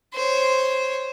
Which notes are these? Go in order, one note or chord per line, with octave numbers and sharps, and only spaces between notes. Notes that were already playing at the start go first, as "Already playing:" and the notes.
C5 C#5